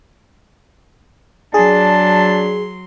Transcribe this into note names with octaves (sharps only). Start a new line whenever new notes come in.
F#3 D4 G#4 A5 C6